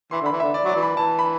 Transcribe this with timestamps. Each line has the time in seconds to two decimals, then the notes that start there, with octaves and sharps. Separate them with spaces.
0.11 E3 C6
0.22 D3 B5
0.32 E3
0.40 D3 E5
0.54 D5
0.65 F#3 D5
0.76 E3
0.83 B5
0.97 E3 A5
1.19 B5